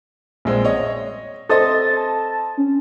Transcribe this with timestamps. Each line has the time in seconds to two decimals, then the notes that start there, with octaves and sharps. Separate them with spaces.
0.45 A#1 G#3 C4
0.65 C#5 D#5
1.49 C4 A4 C5 D#5 D#6 A6
1.97 A5
2.58 C#4